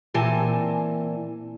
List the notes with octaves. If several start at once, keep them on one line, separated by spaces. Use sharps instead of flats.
A#2 E3 C4 G#5 A5